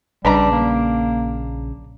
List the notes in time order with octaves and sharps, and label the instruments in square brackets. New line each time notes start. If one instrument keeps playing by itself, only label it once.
[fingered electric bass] A#1 C#3 [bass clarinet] G3 [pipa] D4 B4 A#5
[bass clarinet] A#3